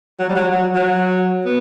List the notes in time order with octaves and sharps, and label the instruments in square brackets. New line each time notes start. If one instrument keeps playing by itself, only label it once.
[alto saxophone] F#3
G3
F#3
F#3
F#3
B3